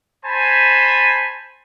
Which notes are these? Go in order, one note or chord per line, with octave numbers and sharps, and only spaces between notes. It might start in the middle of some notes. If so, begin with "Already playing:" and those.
C5 G#5 A5 B5